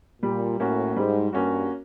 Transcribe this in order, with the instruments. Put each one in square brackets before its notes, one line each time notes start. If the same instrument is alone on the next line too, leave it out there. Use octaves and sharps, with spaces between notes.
[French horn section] A#2 [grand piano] G3
[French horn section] A2 [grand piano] A#3 C#4 F#4
[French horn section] G#2 [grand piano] G3
[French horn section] G2 [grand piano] A#3 C#4 F#4